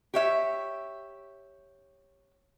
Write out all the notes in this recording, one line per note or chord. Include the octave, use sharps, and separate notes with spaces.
G4 C#5 E5